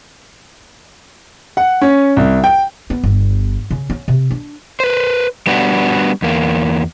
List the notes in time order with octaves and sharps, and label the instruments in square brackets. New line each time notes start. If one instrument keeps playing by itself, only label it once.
[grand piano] F#5
C#4
C2
G5
[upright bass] B3
G1
C#3
C#4
C3
D4
[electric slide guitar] B4 C5
G3 B3 D4 F#4
E2 A#3